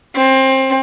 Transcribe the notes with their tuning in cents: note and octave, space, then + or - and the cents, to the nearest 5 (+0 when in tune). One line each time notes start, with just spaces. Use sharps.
C4 +25